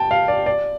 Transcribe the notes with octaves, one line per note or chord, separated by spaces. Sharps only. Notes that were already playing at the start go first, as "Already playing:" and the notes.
Already playing: G5 A5
F5
D5
D5